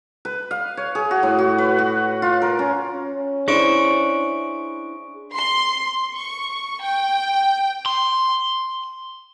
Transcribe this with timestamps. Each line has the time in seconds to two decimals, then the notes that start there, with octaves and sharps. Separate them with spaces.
0.25 B4
0.51 F5
0.77 C#5
0.95 G#4
1.11 F#4
1.23 A2
1.39 F#4
1.58 B4
1.78 F#4
2.22 F4
2.42 A#4
2.59 C#4
2.92 C#4
3.48 D4 E4 G#4 C5 C#6 D7
5.33 C6
6.15 C#6
6.82 G5
7.86 C6